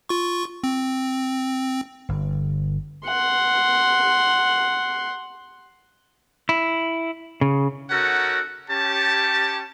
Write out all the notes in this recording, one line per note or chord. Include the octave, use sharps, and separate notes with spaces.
F4 C#6
C4
G1
F#5 C6
E4
C#3
C#4 D#4 F#4 A4 A#4 F#5
C#4 G4 A5